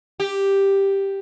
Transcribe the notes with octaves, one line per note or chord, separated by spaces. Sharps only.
G4